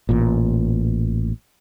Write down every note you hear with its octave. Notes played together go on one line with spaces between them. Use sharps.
A1 A#2